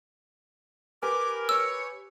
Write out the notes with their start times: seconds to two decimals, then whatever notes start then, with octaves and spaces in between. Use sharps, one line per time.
1.03 G4 A#4 B4 G#5 D6
1.49 C#5 E6